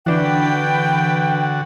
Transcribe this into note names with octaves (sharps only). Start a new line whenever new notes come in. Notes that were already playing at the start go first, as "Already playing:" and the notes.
D3 E3 D4 F#4 B4 G5